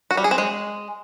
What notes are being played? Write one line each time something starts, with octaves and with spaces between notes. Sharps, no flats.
F#4
G3
G#4
C4
G#3